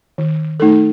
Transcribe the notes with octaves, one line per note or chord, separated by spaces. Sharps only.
D#3
A3 D#4 A4